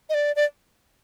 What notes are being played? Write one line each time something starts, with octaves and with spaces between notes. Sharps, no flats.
D#5
D5
D5